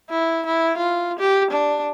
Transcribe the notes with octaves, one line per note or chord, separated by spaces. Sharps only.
E4
E4
F4
G4
D4